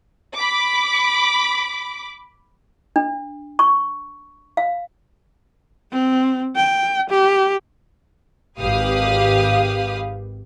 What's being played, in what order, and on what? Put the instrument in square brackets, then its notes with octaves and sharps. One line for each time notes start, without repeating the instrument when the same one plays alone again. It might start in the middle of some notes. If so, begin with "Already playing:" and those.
[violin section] B5 D6
[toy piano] D4
C#6
F5
[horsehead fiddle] C4
G5
G4
[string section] G#1 G4 B4 F5 D#6